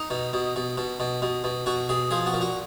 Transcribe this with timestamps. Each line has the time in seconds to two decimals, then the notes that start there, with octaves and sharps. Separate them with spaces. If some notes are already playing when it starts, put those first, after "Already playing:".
Already playing: D#4
0.10 B2
0.33 B2
0.56 B2
0.77 B2
1.00 B2
1.22 B2
1.44 B2
1.66 B2 F#4
1.89 B2 G#4
2.11 F3 G#4
2.26 F#4
2.34 A#2
2.41 F#4